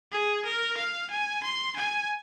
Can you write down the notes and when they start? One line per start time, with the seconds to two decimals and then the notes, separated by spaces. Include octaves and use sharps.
0.12 G#4
0.45 A#4
0.77 F5
1.10 G#5
1.43 C6
1.76 G#5